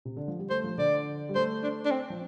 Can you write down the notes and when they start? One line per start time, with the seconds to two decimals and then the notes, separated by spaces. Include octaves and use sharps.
0.05 C3
0.17 D3
0.28 F3
0.39 G3
0.50 A3 C5
0.64 F3
0.78 D3 D5
1.29 G3
1.35 A3 C5
1.63 D4
1.85 D4
1.91 C4
2.10 F3